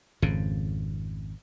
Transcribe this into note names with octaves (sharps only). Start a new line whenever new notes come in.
G#1 F2 C#3